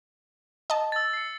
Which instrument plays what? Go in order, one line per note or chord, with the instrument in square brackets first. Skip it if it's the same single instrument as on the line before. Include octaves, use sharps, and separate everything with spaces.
[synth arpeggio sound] D#5 A5
[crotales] E6 A6
C7 C#7